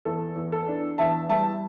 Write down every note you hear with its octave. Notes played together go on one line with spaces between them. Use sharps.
E2 A4
E2
A4
D4
E2 E5 A5
G3 E5 A5